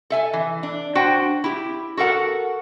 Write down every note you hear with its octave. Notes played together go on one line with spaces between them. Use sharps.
A4 E5 G#5
E3
D4
D4 F#4 C5 F#5 G5
E4 G4
F#4 A4 A#4 F#5